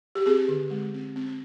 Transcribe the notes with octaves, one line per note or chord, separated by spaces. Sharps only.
G4
C4 G#4
D3
G#3
C4
C4